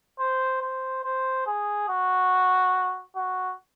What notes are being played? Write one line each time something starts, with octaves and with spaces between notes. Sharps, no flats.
C5
C5
C5
G#4
F#4
F#4